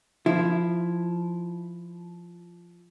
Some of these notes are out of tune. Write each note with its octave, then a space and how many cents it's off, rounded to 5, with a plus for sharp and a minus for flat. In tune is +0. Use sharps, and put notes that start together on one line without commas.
F3 -10 E4 +5